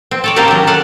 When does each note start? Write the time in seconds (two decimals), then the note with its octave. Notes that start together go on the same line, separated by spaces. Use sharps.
0.11 C4
0.24 A4 C#5 D5
0.36 A#3 C4 C#4 G4 A4 A#4
0.48 D#3 F#3
0.67 A4 F5 F#5